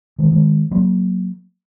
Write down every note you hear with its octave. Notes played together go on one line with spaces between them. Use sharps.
D#3 G#3
D#3 G#3
F#3 A#3